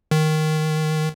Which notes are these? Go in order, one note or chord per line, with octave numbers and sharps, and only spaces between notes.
D#3